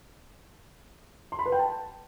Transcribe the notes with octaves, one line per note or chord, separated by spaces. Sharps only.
C6
B5
B4
G5
A5